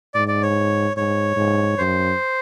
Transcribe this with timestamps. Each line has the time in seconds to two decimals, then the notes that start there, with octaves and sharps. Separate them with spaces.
0.14 G#2 D5
0.28 D5
0.43 C#5
0.97 G#2 C#5
1.36 G#2
1.78 F#2 C5